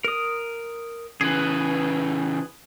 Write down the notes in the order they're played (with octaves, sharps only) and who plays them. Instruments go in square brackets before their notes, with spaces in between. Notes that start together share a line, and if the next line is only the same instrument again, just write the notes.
[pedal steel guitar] A#4 D#6
[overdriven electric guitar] C#3 E3 [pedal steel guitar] G#4 B4